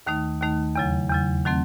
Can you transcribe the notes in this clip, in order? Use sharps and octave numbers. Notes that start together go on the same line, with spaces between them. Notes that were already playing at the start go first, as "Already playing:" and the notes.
D#2 D#3 A3 D#4
D#2 D#3 A3 D#4
E2 C#3 F#3
E2 C#3 F#3
D#3 F#3 A3 C4